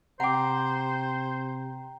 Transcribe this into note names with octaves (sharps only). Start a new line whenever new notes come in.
C3 C5 F#5 G5 A#5 D6